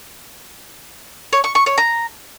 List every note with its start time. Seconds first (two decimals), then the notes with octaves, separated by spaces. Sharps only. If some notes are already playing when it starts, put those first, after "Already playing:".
1.33 C#5
1.44 C#6
1.55 C#6
1.66 C#5
1.78 A#5